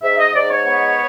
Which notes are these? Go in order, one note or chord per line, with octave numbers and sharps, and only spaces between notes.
G#2 E5
D#5
G#2 D5
C#5
B3